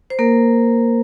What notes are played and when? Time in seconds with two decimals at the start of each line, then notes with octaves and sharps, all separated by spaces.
0.10 C5
0.19 A#3 A#4